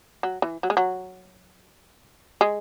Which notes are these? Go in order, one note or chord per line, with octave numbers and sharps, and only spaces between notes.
F#3
E3
F#3
G#3
F#3
G#3